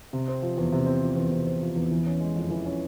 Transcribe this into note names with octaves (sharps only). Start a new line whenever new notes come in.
C3
C4
F3
E2
C3
C4
F3
E2
C3
C4
F3
E2
E3
C#4
G#3
F2
E3
C#4